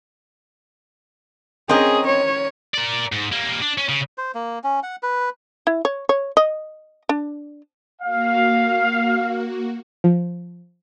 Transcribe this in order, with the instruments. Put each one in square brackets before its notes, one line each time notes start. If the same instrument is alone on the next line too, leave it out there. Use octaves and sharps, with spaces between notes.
[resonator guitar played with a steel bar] C4 D#5 [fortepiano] C#4 A#4 [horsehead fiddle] G#4
[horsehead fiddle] C#5
[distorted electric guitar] A#4 D5
G#2
G3 A#3
D4
C#4
C#3
[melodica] C5
A#3
C#4
F#5
B4
[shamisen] E4
C#5
C#5
D#5
D4
[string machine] A#3 F#4 [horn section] F5
[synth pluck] F3